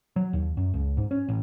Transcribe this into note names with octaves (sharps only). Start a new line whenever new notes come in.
F#3
D#2
F#2
C#2
G#2
C#4
A1